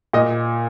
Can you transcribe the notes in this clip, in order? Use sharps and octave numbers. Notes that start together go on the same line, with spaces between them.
A#2 D#5